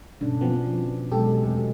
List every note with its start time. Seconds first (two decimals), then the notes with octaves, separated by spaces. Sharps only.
0.21 G2 B2 D3 C#4 D4
0.41 F3 B3 C4
1.12 B2 F#3 G#3 G4 A4
1.42 E2 C3 A3